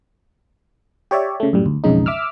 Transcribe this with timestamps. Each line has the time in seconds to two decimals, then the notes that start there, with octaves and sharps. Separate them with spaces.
1.11 G4 C#5 D5 E5
1.40 C#3 A3
1.53 F#2 A2 G3
1.66 D2
1.84 B1 F2 C#3 G#3 D#4
2.06 E5 D6 E6 F6